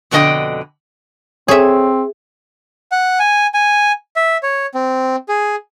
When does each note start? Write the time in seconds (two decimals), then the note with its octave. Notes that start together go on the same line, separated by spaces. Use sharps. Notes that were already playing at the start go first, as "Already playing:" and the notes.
0.11 F2 B2 D3 C4 D#5 G5
1.48 C4 G#4 A4 C#5 E5
2.91 F#5
3.20 G#5
3.54 G#5
4.16 E5
4.43 C#5
4.74 C4
5.29 G#4